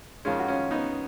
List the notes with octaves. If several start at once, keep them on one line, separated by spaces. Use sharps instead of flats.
F2 D#3 G#3 C#4 F4
F#4
C#4 F4
B3 D#4